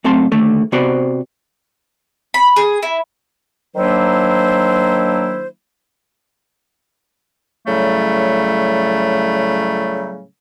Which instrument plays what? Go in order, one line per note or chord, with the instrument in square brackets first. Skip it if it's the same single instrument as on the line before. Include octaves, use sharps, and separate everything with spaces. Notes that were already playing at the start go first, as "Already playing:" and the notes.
[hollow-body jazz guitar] F#2 A3 C4 A5 C6
D#2 D3 A3 A4
C3 B3 F#4 C5 D5 B5
[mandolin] B5
G#4
E4
[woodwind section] D#3 F#3 A#3 D4 E4 C5
A2 C#3 F#3 G3 A3